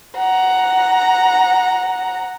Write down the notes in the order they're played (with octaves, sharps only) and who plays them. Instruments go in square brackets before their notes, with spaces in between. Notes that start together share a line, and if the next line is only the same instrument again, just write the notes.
[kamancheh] F#5 A#5